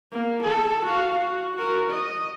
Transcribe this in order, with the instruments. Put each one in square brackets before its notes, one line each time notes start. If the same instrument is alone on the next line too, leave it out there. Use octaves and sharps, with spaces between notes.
[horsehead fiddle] A#3
A4
F#4 F5
F#4
F#4 A#4
D#5